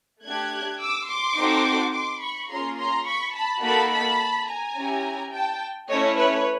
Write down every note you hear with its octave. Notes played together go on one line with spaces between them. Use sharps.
A3 D4 G4 F#6 G#6
D6 E6
C6 D6
C4 D#4 F#4 A4
C6 D6
B5 C#6
A#3 C#4 F4 G#4 A#5 C6
A#5 C6
B5 C#6
A5 B5
A#3 D#4 F#4 A4 A5 B5
A5 B5
G#5 A#5
C#4 E4 G4
G5 A5
A3 C#4 E4 C#5 D#5
B4 C#5